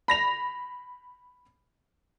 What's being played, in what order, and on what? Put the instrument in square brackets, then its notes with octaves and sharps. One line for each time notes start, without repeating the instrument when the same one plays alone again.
[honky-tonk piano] B5 A#6 F7